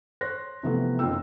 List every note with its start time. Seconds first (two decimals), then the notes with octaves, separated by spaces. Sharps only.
0.21 C5 C#5 C6 F#6 A#6
0.63 C3 E3 F3 A3 B3
0.99 F#1 D#4 F4 G5 E6